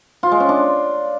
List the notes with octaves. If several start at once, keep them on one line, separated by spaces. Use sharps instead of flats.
F4
G#3
C#4
D4